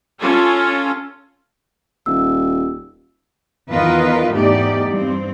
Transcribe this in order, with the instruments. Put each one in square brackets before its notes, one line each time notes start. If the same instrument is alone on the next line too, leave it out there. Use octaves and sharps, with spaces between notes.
[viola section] C#4 F4 A4
[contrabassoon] D#1 [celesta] E6
[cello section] E2 D#3 F4 A#4 B4 D#5
E2 G#2 A3 D#4 G4 D5
G2 C4